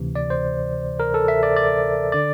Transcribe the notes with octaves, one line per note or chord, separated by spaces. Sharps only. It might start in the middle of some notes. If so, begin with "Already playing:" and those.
Already playing: D2 C3 E3
D5
C5
A#4
A4
E5
D5
D5
D3 D5